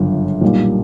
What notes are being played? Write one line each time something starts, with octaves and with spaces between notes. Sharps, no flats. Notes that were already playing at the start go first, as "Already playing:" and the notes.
Already playing: G1 F#2 C#3 F3
B1 A#2 G3 A#3